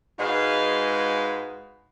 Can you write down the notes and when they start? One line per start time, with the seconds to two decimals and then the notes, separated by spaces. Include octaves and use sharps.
0.19 G#2 G#3 F#4 B4 F5